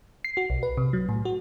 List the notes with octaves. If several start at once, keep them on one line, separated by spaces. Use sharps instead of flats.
C7
F#4
B1
B4
C3
F#3
A2
F#4